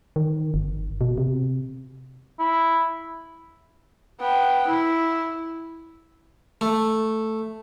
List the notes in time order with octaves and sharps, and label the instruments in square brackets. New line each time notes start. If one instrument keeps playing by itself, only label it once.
[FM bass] D#3
G1
B2
C3
[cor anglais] E4
[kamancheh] B3 G5
E4
[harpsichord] A3